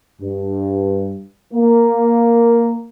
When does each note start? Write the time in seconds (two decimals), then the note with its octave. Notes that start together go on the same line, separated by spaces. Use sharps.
0.21 G2
1.53 A#3